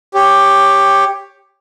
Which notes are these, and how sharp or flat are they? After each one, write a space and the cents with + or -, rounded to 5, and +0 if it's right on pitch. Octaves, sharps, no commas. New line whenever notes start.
G4 +10 C#5 -5